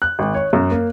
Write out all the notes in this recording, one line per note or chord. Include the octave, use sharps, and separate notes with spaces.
F#6
G#1
C#5
F#2
A#3